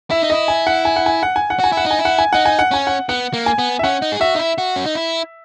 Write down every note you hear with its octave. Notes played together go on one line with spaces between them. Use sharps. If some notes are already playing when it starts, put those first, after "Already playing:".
E4 E5
D#4
E4 D#5
G#5
F#5
G#5
F#5
G#5
F#5
G#5
F#5
F#4 G#5
E4 F#5
D#4
G#5
E4
F#5
G#5
D#4 F#5
G#5
F#5
C#4 G#5
F#5
B3 F#5
A#3
G#5
B3
E5
C#4 F#5
D#4
G#4
F#4 E5
D#4
E4
F#4
C#4
D#4
E4